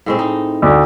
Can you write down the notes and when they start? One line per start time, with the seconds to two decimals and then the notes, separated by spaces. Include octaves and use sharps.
0.06 A2 G#3 C4
0.19 D#4
0.62 D2